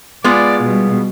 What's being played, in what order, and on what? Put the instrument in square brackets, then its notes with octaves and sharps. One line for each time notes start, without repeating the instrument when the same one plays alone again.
[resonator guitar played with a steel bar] G#3 B3 F4 [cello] D5
[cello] B2 G3